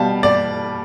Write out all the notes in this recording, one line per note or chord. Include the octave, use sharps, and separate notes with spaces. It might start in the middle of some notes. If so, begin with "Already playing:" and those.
Already playing: B2 G3 F5 A5
D5